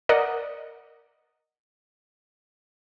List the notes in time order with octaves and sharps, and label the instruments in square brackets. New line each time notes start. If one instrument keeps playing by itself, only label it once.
[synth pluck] A#4 D5 D#5 F#5